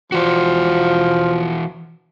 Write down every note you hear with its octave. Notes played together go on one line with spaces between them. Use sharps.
E3 F3 F#4